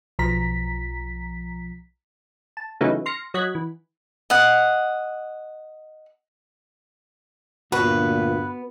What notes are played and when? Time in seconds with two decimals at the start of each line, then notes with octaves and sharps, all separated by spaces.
0.19 B1 F3 A#5 B6
2.57 A5
2.81 C#3 E3 F#3 A3 B3 D#4
3.06 C6 F6 A#6 C#7
3.34 F#3 D#5 F#5 F#6 G#6 B6
3.55 E3
4.30 D#5 F#5
7.72 D2 G2 A#2 B3 F#4 B4